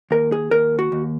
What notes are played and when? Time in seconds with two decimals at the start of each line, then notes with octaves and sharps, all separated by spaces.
0.11 D#2 A#4
0.32 G#4
0.51 D#2 A#4
0.79 F#4
0.92 D#2